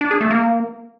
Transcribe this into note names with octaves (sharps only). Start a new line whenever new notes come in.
D4
G#4
A3
A#3